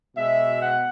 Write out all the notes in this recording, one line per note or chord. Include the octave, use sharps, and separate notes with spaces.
B2 G#3 E5
F#5